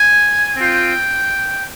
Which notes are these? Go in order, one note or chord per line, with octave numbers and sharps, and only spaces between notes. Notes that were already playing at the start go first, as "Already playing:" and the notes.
Already playing: G#5
C4 F4 G5